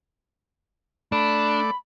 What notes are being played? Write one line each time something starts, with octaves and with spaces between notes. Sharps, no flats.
A3 D4 D5 B5